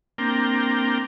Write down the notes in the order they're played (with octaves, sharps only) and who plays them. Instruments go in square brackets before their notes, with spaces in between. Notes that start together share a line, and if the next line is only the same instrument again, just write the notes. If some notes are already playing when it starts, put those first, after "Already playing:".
[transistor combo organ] A#3 C4 D4 A#4 G5